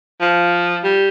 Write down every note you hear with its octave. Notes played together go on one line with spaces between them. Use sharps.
F3
G3